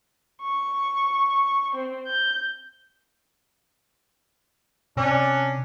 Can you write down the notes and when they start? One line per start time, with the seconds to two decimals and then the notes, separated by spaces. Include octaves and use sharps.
0.43 C#6
1.75 C4
2.07 G6
4.97 C3 C#4 D4